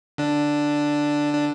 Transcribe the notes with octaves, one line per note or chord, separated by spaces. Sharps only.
D3 D4
D4